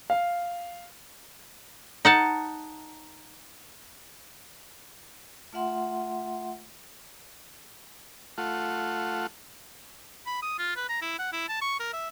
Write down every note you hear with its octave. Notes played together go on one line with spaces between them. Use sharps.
F5
D#4 F#5 A5
A3 F4 E5 F#5 C6
A3 F4 F#5
B5
D#6
F4
B4
A#5
E4
F#5
E4
A5
C#6
A#4
E5